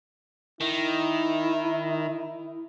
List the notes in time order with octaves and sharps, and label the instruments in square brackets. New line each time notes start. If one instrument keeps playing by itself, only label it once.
[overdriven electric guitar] D#3 [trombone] E4